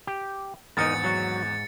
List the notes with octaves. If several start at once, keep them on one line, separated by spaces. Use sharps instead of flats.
G4
G#1 E2 G#2 D#4 A#4 D#6 A6 C#7
F#3 F#4